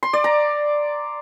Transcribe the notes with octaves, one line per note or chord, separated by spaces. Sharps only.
C6
D5
A#5